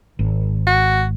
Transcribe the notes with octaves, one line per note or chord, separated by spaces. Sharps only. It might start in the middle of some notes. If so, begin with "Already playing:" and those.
G#1
F#4